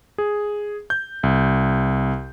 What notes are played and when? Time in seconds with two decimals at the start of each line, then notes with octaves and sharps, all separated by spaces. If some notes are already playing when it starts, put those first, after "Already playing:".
0.18 G#4
0.90 G6
1.23 C2